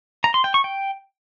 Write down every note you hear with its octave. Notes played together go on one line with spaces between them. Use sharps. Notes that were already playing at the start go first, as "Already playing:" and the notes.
A#5
C6
G5
C#6
G5